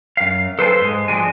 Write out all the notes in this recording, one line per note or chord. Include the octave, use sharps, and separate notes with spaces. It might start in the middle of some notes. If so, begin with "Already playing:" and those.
F#2 F5
A4 B4 C5 F5 G5 A5
G#2 G#3
F3 G#3 D4 F#4 G#5